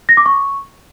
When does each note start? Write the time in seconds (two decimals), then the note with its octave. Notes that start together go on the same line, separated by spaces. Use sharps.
0.09 A#6
0.17 D6
0.26 C#6